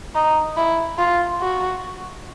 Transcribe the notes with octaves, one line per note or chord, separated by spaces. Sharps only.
D#4
E4
F4
F#4